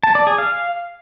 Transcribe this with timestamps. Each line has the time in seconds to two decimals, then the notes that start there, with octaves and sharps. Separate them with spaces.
0.04 A5
0.15 D5
0.27 G#4
0.38 F5